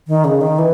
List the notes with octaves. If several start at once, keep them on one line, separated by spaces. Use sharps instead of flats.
D#3
C#3
D#3
E3